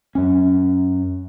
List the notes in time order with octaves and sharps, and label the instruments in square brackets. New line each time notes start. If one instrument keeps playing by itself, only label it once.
[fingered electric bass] F#2 C#4